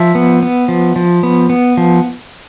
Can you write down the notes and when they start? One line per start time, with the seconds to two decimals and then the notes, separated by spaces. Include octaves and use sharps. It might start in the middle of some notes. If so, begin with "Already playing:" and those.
Already playing: F3 E5
0.15 B3
0.43 B3
0.68 F3
0.96 F3
1.23 B3
1.50 B3
1.77 F3